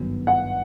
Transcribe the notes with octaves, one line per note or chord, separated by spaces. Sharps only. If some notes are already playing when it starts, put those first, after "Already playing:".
Already playing: G#1 G2 D#3 F#3 B3
F#5